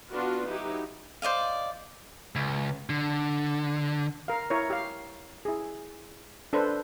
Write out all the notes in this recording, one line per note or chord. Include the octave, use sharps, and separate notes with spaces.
B3 D4 F4 F#4 B4
F#3 D#4 E4 G4
C5 D5 D#5 F5
C#2
D3
A#4 F5
E4 A#4 C#5
G4 F5
E4 G#4
D4 A4 B4 C5